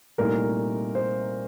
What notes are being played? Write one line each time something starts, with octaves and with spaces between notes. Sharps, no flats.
C2 A#2 A3 D#4 A#4
C5